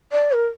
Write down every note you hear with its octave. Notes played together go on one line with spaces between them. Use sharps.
D5
A#4